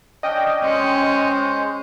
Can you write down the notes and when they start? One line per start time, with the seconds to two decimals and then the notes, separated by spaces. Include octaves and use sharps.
0.23 C#4 D4 D#5 G5
0.63 G#3 C#4 C5